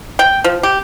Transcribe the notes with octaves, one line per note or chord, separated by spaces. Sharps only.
G5
F3
G4